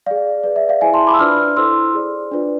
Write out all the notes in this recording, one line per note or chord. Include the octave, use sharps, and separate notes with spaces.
G#4 D5 F5
G#4 B4 D5
E5
D5 F5
E4 G#4 C5 E5 G#5
A5 C6
B5 D6
E6
D4 F4 B4 D5 D6 F6
E4 A4 C5 C6 E6
G#4 D5
D4 F4 B4 D5